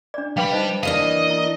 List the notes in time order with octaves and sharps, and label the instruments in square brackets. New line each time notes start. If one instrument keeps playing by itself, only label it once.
[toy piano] D4 D5
[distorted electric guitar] G3 B5 [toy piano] B4 F5 G5
[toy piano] D#4 C5 D#5
[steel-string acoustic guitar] E3 A#3 D4 [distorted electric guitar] D#5 [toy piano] F5
[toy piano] E4